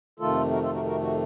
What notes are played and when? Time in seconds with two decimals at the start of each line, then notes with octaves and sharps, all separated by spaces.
0.19 F2 C3 D#3 A3 F4 A4
0.52 F#4 A#4
0.63 F4 A4
0.74 F#4 A#4
0.85 F#4 A#4
1.01 F#4